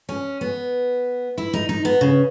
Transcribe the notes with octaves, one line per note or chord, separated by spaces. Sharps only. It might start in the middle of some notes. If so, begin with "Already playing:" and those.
C#4
B3
E4
D#4
D#4
B3
C#3